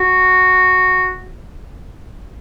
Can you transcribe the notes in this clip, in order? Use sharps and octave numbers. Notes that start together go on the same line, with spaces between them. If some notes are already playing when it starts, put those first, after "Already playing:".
Already playing: F#4